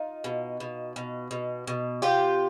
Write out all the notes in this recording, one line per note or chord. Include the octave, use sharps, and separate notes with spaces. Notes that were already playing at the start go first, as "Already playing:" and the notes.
Already playing: D#4 F4
B2
B2
B2
B2
B2
C3 F4 G4